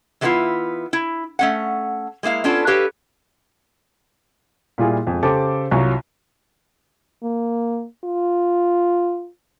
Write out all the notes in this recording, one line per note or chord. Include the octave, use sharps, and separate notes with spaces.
E3 F#3 A3 B3 E4 F4
E4
A3 C#4 F#5
G#3 A#3 E4 F5
B3 C#4 D4 F4 A4
G4 A4 B4 C#5 F5
A#2 G3 E4 F4 G#4
F2 G#3
C#3 G4 A4 C5 A5 D6
C2 F#3 F4 F5 A#5 C#6
A#3
F4